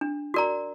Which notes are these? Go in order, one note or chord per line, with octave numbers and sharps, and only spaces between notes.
D4
F#4 A#4 D5 A#5